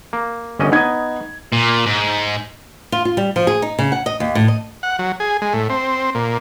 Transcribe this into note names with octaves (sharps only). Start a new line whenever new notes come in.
A#3
G1 C#4 D#5
B3 D#4 D#5 G#6
A#2
G#2
F4
F4
G3
F3
G#4
D#4
C#3
F#5
D#5
D#2
A2
D#5
F#5
F#3
G#4
G#3
A2
C4
A#2